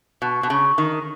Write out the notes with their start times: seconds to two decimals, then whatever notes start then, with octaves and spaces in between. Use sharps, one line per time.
0.22 B2
0.43 B2
0.50 C#3
0.78 D#3